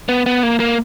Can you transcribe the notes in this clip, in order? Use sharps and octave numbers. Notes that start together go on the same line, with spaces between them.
B3
B3
A#3
A#3